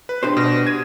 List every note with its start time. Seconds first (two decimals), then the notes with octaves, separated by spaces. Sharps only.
0.09 B4
0.23 D4 G4 C5
0.37 B2
0.67 G#6 D#7